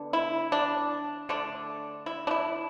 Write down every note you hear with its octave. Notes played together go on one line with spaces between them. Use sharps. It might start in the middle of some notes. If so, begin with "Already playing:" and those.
Already playing: D3 B3 D4
E4
D4
D3 A3 D4
E4
D4
E4